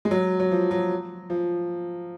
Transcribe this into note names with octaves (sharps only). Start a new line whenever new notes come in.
G#3
F#3
F#3
F3
F#3
F3